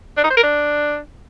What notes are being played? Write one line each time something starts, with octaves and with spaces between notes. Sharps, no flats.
D4
D#4
C5
A#4
D4